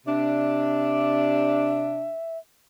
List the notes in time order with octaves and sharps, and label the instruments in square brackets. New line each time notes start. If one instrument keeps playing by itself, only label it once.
[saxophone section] C3 D4 [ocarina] E5